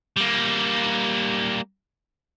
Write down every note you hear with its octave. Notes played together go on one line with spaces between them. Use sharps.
G3 A#3